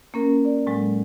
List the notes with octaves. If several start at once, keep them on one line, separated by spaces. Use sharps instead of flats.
A#3 C#4 A#4
D5
A2 F#3 G#3